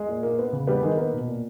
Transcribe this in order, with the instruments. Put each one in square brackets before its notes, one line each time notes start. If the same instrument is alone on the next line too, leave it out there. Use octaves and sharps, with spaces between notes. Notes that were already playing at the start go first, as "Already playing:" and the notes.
Already playing: [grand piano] G#3 G#4
A#2
A#3
B3
C#3
G3 B3 G4
D#3 G#3 G#4
A#3 B3 A#4
B2
A#2